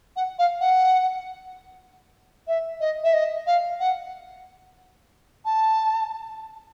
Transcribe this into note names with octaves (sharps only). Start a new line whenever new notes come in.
F#5
F5
F#5
E5
D#5
E5
D#5
F5
F#5
A5